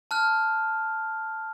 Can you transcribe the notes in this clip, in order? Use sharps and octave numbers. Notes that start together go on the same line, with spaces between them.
A5 F6 F#6